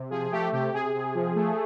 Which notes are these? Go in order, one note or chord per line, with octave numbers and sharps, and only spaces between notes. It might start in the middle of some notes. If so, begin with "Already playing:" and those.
Already playing: C3
F3 G#4
A3 G4
C3 G4
C3 G#4
C3
F3
A3